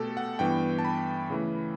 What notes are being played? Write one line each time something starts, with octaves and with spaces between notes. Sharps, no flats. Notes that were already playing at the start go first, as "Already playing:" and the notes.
Already playing: B2 A3 G4 A4
F#5
G2 E3 B3 G5
A5
B5
C#3 E3 A3